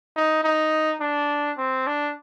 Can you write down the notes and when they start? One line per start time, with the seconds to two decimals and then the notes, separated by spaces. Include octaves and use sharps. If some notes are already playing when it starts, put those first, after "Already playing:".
0.16 D#4
0.44 D#4
1.01 D4
1.58 C4
1.87 D4